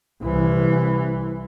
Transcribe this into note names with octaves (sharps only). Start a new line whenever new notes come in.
C2 E3